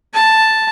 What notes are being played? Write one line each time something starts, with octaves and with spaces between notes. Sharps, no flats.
A5